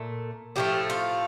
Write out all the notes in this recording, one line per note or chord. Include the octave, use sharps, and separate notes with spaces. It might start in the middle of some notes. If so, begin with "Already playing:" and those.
Already playing: A#2 A3
A2 F3 A3 G4
F4